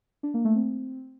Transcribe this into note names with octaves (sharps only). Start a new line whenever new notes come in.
D4
A#3
A3
C4